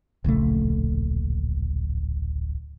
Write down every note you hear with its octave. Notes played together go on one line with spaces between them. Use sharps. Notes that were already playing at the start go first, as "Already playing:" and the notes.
D1 A#1 C#3 A3